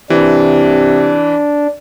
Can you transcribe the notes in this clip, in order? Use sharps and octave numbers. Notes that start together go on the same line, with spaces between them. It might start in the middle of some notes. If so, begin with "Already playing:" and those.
C3 E3 D4